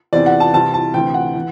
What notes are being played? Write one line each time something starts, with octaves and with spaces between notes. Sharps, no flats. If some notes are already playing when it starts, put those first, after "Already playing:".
E2 C3 E3 D5
F#5
A5
C2 C3 E3 A5
A5
D2 C3 E3 G5
F#5
E3